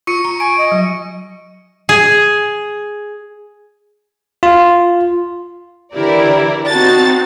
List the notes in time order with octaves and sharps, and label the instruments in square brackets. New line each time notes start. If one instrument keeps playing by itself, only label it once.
[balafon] F4 [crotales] C#6 C#7 D#7
[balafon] A#5
[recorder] G#5 [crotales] D7
[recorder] D#5
[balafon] F#3
[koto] G#4
[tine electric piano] F4
[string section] D3 E3 E4 G4 A#4 D5
C4 D#4 F#4 A5 A6